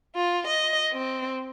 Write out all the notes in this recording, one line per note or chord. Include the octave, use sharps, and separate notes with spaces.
F4
D#5
C4